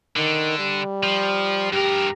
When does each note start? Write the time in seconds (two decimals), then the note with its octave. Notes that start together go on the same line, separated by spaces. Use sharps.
0.16 D3 D#3
0.59 G3
1.03 F3
1.73 G2 G4 A#4